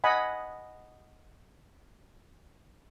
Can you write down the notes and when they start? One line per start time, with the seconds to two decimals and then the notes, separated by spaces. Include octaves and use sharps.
0.04 D#5 F#5 G#5 B5